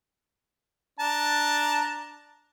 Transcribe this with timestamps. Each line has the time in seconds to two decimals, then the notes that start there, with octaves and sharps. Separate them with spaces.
1.00 D4 A5 A#5